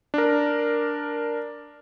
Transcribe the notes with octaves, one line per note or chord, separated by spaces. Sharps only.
D4 A#4